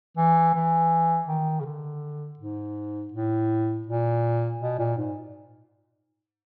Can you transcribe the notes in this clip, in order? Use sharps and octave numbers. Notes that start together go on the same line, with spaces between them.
E3
E3
D#3
C#3
D3
G#2
A2
A#2
B2
A#2
G#2